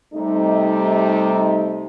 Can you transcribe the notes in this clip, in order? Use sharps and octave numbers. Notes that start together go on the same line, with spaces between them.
C3 G3 A3 D#4